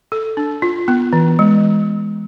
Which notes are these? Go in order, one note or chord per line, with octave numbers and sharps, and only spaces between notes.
A4
D4
F4
B3
E3
G#3